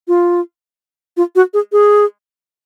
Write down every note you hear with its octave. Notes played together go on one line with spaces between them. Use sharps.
F4
F4
F#4
G#4
G#4